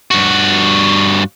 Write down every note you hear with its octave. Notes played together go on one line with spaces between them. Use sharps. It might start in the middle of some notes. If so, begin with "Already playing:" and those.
G2 F#4